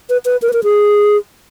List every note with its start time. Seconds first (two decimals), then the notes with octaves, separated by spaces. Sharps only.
0.10 B4
0.25 B4
0.42 A#4
0.49 B4
0.53 A#4
0.64 G#4